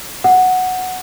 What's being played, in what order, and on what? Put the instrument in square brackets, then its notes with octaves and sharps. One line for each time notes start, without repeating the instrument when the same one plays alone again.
[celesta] F#5